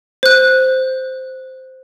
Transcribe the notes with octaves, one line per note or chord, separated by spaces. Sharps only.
C5 F#6